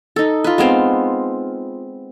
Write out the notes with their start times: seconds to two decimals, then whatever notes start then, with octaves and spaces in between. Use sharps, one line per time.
0.16 D#4 A4
0.44 F4 B4
0.58 G#3 B3 C4 F5